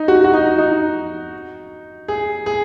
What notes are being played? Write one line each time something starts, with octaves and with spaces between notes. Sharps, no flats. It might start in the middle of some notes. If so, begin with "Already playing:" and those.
Already playing: D#4
F#4
F#4
D#4
D#4
G#4
G#4